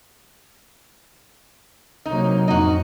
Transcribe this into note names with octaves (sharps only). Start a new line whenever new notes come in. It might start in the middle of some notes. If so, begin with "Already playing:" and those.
C3 F#3 A#3 D#4
F2 A2 D#4 F#4